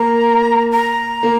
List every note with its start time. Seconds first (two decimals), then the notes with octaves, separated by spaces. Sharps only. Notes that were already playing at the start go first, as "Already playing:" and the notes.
Already playing: A#3 A#5
0.72 A#5
1.23 A#3